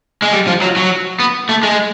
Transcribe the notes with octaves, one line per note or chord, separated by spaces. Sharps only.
G#3
G3
F3
F#3
F#3
B3
A3
G#3